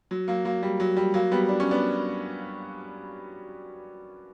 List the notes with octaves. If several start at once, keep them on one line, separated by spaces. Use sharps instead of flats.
F#3
F#3 A#3
F#3 A#3
G3
F#3
G3
F#3 A#3
G3 B3
D4
C#4
B3 D4